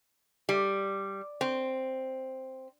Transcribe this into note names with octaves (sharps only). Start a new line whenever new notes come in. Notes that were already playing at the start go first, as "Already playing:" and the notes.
G3
C4